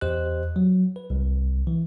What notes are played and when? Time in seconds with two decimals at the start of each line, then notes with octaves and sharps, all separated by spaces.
0.01 E2 G4 C5 D#5 F#6
0.56 F#3
0.96 B4
1.10 C2
1.67 E3